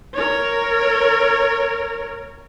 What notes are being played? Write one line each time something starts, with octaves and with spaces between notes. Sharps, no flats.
A#4 C#5